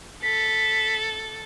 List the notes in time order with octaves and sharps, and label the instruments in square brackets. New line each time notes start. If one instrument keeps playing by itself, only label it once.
[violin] A4 [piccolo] B6